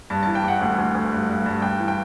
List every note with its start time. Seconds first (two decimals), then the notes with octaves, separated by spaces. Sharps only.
0.10 G2 A5
0.23 E3 A5
0.35 G5
0.44 G2 F#5
0.61 D2
0.78 D2
0.95 D2
1.12 G2
1.29 G2
1.46 G2
1.62 G2 G5
1.79 E3
1.88 G5